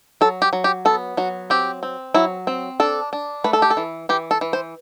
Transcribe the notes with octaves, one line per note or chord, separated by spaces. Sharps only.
F#3 A4
G4
F#3
G4
B3 A4
F#3 F#4
C4 G4
C4
F#3 E4
C4
D4 A4
D4
A3 B4
A4
G4
A4
E3
E3 G4
A4
E3
C5